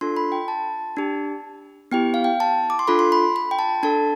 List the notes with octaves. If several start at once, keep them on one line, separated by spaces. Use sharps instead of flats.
D4 F4 A4 C6
B5
G5
A5
D4 G4
B3 E4 G4 G5
F5
G5
A5
D6
C6
D4 F4 A4 B5
C6
B5
B5
G5
A5
D4 A4 A5